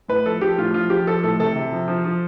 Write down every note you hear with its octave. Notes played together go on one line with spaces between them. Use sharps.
A2 B4
F3 A4
F3 G4
A2 F4
F3 F4
F3 G4
F3 A4
A2 A4
C3 A4
C3
F3
F3
F3